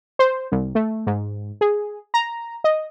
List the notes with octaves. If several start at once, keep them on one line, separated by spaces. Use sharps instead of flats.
C5
C2
A3
G#2
G#4
A#5
D#5